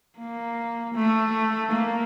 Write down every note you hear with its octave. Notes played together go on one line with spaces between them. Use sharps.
A#3
A3
A#3